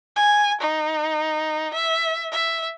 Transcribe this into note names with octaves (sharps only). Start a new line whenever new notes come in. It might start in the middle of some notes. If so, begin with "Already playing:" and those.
G#5
D#4
E5
E5